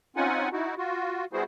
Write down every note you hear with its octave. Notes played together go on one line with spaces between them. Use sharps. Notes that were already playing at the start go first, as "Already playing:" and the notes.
C4 C#4 D#4 F4 F#5 G#5
D#4 E4 F#4
F4 F#4
G3 B3 E4 F#4 G#4 C5